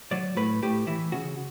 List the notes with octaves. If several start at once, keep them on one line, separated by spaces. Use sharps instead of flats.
F#3 D5
A2 B4
A2 G4
E3 E4
C#3 F#4